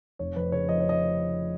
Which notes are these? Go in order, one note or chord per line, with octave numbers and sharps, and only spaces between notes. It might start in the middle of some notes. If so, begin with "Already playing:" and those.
F1 C#5
F2 B4
C#3 C#5
F3 D#5
C#5
D#5